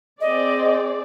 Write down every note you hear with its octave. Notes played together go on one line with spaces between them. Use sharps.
C4 G#4 D5 D#5